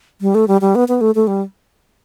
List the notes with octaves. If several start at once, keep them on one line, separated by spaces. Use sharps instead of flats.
G3
A3
G3
G3
B3
B3
A3
A3
G3